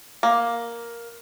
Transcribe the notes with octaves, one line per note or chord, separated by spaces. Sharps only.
A#3